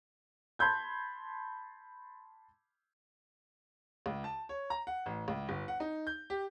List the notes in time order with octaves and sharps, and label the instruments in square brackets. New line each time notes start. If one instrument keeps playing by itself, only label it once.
[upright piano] A5 B5 C6 G6 G#6
[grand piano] C#2
A5
C#5
A#5
F#5
A1
C#2
G1
F#5
D#4
G6
G4